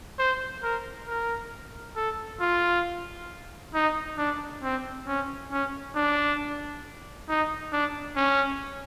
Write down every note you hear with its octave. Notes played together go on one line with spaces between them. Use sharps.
C5
A#4
A#4
A4
F4
D#4
D4
C4
C#4
C#4
D4
D#4
D4
C#4